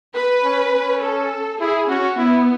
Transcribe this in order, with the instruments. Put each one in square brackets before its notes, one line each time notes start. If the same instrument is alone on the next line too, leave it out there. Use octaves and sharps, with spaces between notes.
[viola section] B4
[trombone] C#4
C#4
[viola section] A4
[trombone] E4 [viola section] G#4
[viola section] C#4 [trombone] F#4
[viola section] B3 [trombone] E4